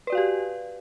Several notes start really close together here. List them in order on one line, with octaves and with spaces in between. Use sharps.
B4 D5 F#4 F5 G4